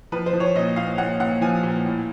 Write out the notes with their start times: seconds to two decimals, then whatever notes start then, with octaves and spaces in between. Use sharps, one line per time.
0.12 F3 B4
0.26 C5
0.33 F3
0.40 C#5
0.56 A#2 D#5
0.76 A#2 F5
0.98 A#2 F#5
1.20 A#2 F#5
1.41 F3 G#5
1.63 A#2
1.85 A2